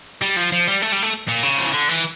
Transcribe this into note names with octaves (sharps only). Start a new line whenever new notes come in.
G3
F3
F3
G3
A3
G3
A3
A#2
C#3
F3
E3
D3
E3